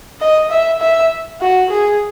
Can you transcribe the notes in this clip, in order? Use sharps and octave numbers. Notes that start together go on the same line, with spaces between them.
D#5
E5
E5
F#4
G#4